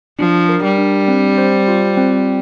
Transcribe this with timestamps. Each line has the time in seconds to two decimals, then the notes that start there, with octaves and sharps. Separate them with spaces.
0.19 F3 D4
0.49 A#4
0.64 G3
0.78 D4
1.08 C4
1.38 C5
1.68 F4
1.97 C4